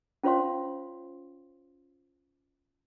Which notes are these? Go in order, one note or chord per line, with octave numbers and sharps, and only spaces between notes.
C#4 F4 C5 C#5 F5 C6